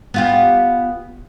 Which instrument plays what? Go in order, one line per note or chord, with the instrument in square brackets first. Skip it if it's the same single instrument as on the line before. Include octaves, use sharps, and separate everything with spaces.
[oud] B3 F4 G4